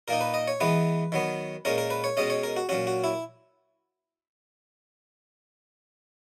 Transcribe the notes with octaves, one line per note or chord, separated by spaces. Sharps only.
A#2 A#3 D#4 A#4
B4
D#5
C#5
E3 G#3 B3 B4
D#3 F#3 B3
A#2 G#3 C#4 A#4
A#4
B4
C#5
B2 G#3 C#4 D#5
C#5
A#4
F#4
A#2 F#3 C#4 F#4
F#4
E4